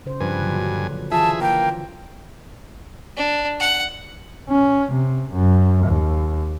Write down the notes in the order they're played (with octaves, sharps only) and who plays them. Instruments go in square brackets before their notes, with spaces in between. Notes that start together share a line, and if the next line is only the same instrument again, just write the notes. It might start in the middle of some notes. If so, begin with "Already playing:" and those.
[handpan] C#3 C5
[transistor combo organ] G2 G#5 [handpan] F3 B4
[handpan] A#2 D3 F#3
[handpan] E3 F4 [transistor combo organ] G#4 E5 [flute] A5
[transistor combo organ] A#3 [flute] G5
[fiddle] D4
F#5
[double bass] C#4
C3
F#2
D#2